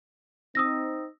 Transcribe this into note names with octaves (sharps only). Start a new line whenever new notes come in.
C4 D#4 D#6 E6 A#6